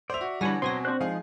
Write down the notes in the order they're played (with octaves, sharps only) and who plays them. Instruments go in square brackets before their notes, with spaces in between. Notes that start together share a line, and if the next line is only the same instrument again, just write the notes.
[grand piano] C5 F7 [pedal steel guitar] D5 E5
[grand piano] F#4
[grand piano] D3 E3 D4 [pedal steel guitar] G3 B5 [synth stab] C#5 G#5 A#6
[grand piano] B2 [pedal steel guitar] F#3 C6 [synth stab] C4 G#5 A#6
[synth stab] C4 D4 C5 [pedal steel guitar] F#4 F#6
[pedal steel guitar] F3 G#3 D#4 [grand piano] G#4 F5